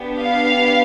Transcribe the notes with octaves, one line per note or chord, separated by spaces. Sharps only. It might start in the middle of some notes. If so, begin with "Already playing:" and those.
Already playing: B3 D4 G4
F5